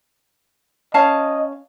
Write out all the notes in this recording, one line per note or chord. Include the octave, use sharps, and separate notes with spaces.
C#4 D#5 F5 A5